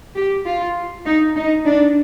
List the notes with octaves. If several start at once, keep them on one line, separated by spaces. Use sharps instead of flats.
G4
F4
D#4
D#4
D4